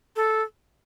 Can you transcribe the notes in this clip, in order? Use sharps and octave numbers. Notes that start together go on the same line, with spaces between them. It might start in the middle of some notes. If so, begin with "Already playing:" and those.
A4